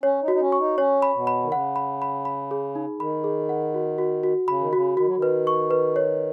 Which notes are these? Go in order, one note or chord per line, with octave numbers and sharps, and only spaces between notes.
C#4 C#5
D#4
F#4
D#4
C#4
C#6
D#4
C#4 C#5
B5
B2
B5
D#3
C#3 F#5
B5
B5
B5
G#4
D#4
D#3 B5
G#4
F#5
F#4
F#4
F#4
C#3 B5
D#3
C#3 F#4
D#3 F#4
F#3
D#3
B4
C#6
B4
C#5